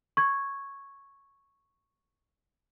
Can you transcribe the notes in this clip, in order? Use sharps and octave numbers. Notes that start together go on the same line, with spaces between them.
C#6 G#6